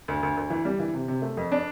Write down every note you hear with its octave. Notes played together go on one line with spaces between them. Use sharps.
D2
D2
D2
E3
G3
E3
C3
C3
A3
F2
D4